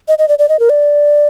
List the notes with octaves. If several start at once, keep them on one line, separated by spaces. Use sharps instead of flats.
D#5
D#5
D5
D5
D#5
A#4
D5